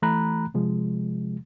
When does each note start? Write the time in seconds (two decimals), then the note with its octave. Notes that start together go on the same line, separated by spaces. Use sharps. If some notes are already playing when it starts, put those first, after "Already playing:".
0.02 E3 A3 A#5 B5 F#6
0.54 C3 F3 G#3